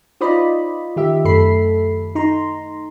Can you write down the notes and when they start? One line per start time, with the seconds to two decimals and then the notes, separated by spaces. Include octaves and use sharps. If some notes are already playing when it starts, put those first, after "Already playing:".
0.21 D#4 F4 C5 D5 D#5 B5
0.96 D#3 G4 E5
1.25 F#2 A3 A4 B5 C7
2.15 D#4 A#5 C6